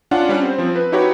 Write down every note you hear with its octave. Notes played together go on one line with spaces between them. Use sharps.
C#4 D4 F4 F#5
G3 C#4 D4
C4 C5
F3 C4
B4
D#4 E4 F#4 G4 B4 C#5